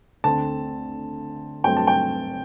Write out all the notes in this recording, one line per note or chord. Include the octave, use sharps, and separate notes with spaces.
D2 D3 A3 C4 A5
G2 F#3 A3 C4 G5
A5
G5